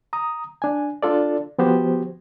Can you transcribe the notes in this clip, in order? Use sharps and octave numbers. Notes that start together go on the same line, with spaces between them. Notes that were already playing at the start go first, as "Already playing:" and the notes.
A#5 D#6
D4 G#5
D4 F4 A4 D5
F3 B3 F#4 G4 C5